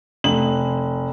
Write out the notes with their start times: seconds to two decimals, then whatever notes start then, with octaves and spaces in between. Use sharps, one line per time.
0.24 F1 F#7